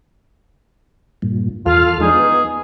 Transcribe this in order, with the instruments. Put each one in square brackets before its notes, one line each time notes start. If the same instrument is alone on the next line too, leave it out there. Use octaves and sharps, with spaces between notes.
[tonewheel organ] G2 A#2
[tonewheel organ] E2 A4 F6 [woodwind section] F4
[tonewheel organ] F3 G#3 D4 [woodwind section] D#4 G#4
[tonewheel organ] B3